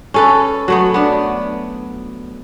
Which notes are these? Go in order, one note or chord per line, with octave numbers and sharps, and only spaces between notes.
C#4 A4 B4
F#3 A3 B3
B3 D4